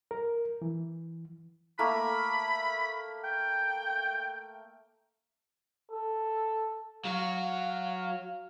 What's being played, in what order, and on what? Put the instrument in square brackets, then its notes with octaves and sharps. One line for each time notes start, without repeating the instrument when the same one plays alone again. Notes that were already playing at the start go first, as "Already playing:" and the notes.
[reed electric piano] A#4
E3
[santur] A3 A#3 A#4 [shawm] B5
[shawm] G5
[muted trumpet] A4
[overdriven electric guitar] F#3 F#4 [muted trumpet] F5